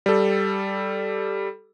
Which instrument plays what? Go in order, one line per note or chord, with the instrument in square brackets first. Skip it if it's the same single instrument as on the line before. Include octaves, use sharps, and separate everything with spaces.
[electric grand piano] G3 A4